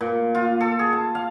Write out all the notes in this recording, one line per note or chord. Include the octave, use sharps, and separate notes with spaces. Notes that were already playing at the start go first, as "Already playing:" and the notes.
A#2
F4
A4
G#4
A5
F5